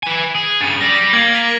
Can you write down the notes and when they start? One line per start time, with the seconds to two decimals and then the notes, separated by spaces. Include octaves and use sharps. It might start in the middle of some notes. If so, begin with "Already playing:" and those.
0.03 B4 G#5
0.35 G#4
0.61 G2 C#3 A6
0.81 G3 D5 A#6
1.13 A#3 G#6 F#7 G7
1.34 A#6 B6 D#7